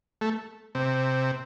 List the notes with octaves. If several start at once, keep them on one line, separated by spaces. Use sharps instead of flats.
A3
C3